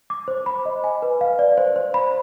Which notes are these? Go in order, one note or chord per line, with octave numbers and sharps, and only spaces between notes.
D6
C5
B5
D#5
G#5
B4
F5
D5
C5
C5
B5